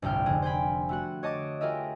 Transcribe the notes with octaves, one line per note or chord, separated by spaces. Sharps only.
G1 C2 A2 G5 F6
F1 D3 G#4
C5 G5 G#5 B5
A3 F#4 F#5
C#5 D#5 A5 D6 D#6
F4 G4 G#4 A#4 D#5 E5